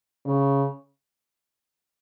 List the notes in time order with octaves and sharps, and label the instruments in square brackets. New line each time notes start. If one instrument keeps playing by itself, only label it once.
[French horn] C#3